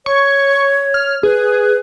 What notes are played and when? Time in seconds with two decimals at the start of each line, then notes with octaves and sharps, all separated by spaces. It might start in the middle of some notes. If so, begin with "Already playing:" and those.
0.06 C#5 C#6
0.94 F6
1.23 G#4 B4